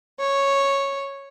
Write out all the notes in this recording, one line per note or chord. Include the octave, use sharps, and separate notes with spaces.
C#5